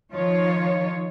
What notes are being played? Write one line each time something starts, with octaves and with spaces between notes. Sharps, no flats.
D#3 F3 D#4 F4 C#5